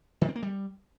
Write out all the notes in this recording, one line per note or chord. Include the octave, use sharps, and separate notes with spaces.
D#3
C4
A#3
G3